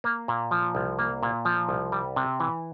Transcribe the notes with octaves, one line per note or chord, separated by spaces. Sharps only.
A#3
A#2
F3
C2
A#3
A#2
F3
C2
G3
C3
E3